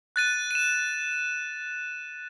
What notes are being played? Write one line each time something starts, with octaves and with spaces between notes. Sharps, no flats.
F#6 A6 D#7
D#7 E7